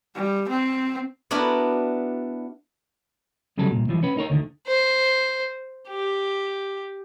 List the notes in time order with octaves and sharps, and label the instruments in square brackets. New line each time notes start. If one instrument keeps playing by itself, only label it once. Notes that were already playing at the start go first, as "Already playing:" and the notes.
[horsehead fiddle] G3
C4
[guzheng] B3 D4 E4 F#4 A#4
[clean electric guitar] C2 C#3 F#3 G3 A4
C2 A#2
C2 E3 F3
C#4 B4
D#4 A#4 C#5
D2 D3 D#3
[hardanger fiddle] C5
G4